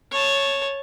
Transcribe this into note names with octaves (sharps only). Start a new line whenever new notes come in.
C#5 A5